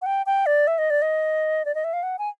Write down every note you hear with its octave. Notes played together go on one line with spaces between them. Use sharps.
F#5
G5
G5
D5
E5
D#5
D5
D#5
D5
D#5
E5
F5
F#5
G#5